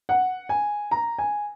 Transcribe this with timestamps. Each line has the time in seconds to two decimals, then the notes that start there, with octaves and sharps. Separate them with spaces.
0.09 F#5
0.49 G#5
0.91 A#5
1.18 G#5